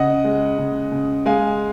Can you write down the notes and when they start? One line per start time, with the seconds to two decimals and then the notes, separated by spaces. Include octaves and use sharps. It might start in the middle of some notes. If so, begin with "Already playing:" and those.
Already playing: C#3 D#5 F#5
0.24 G#3
0.58 C#3
0.92 C#3
1.26 G#3 F5 G#5